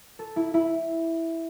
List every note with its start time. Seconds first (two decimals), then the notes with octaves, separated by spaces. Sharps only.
0.19 A4
0.36 E4
0.54 E4